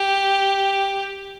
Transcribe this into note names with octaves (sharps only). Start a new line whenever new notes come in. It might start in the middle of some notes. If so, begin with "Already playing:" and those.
Already playing: G4